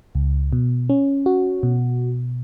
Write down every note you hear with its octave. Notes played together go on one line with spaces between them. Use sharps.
C#2
B2
C#4
F#4
B2